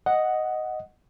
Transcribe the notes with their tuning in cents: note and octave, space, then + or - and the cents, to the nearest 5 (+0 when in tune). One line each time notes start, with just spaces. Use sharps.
D#5 +0 F#5 +0